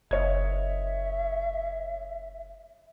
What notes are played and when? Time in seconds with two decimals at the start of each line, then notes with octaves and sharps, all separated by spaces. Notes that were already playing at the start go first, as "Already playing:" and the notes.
0.11 F#1 C#5 D#5 E5 G#6